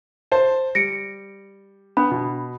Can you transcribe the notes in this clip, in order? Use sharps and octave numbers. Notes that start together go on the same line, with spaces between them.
C5 A5
G3 A#6 C#7 D7
B3 D4 B5
B2